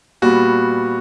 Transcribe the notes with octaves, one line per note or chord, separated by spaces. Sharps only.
A#2 G3 B3 F#4